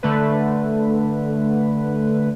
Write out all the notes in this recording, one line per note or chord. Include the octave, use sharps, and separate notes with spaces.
D3 A3 B4